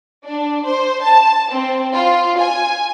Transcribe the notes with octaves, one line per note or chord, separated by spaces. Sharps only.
D4
C5
A5
C4
F4
G#5